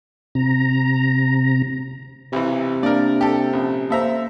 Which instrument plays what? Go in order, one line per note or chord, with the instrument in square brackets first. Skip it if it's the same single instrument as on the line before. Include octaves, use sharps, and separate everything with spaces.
[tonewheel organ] C3 A#5
[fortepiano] B1 E3 [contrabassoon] C3
[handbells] A#3 D4 [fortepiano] A#4 D5
[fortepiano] G4 A4
[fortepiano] A#1 [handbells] C#4
[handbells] A#3 C5 [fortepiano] A4 E5 A#5